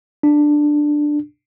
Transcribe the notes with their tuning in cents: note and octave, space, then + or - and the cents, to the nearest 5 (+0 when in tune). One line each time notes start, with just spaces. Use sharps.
D4 +10